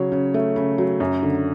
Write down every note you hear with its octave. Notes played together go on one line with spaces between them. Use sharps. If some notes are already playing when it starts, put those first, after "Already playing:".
Already playing: C#3 F#3 C#5
C#3
A3
C#3
F#3
F#2
D3